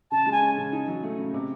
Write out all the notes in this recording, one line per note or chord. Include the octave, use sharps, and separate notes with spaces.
C#3 A5
G#3
G#5
C#4
C#3
D#4
F#3
A3
C#3
C3